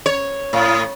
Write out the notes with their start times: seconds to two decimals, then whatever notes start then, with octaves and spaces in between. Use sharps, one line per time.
0.06 C#5
0.53 A2